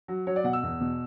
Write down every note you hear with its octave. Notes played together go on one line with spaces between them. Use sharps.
F#3
F#3 C#5
D5
B2 F#5
E6
E2
B2